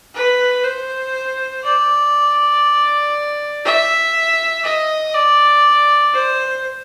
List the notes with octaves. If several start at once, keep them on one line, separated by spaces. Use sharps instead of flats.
B4
C5
D5
E5
D#5
D5
C5